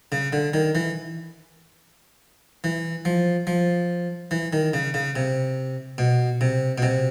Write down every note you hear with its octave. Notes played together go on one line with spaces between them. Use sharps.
C#3
D3
D#3
E3
E3
F3
F3
E3
D#3
C#3
C#3
C3
B2
C3
B2
C3